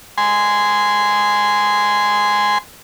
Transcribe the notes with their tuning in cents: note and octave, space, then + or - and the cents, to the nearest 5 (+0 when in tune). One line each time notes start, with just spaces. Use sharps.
G#5 +0 C6 -15